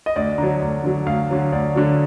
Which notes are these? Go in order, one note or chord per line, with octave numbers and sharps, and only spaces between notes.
D#5
D2 D5
D3 F#3 A#5
D2
D3 F#3
D2 F5
D3 F#3
D2 D5
D3 F#3